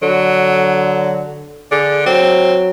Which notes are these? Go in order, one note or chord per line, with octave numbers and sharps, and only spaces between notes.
D3 F#3
D3 G#4
F#3 C4